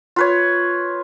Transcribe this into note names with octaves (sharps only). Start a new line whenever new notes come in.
F4 B4 C#5